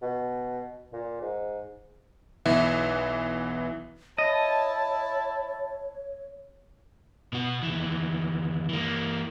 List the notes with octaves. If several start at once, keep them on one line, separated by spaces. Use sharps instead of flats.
B2
A#2
G#2
B1 E3 B3 E5
E4 C#5 D#5 A5
B2 F#4
D#2 E3
E3 A#3